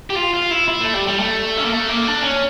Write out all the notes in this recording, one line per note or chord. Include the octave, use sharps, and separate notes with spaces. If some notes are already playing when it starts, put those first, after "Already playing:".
G4
F4
F4
E4
E4
A3
G3
G3
A3
C#4
A#3
A3
A#3
D4
C#4